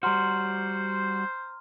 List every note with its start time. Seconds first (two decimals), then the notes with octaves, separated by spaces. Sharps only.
0.03 G3 F#4 C5 A#5 C6 F6